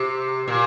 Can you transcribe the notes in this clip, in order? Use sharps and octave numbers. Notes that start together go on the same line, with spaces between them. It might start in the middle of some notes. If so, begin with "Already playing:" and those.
Already playing: C3
A#2